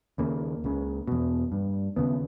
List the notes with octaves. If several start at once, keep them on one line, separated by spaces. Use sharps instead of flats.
D#2 C#3 A#3
C#2 C#3
E2 B2
G2
D#2 C#3 B3